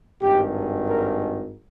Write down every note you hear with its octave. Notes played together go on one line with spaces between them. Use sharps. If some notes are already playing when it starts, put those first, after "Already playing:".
G#1 G2 D#3 G4
A#4